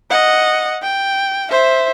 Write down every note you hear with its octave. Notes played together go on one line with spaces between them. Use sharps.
D#5 F#5
G5
C5 E5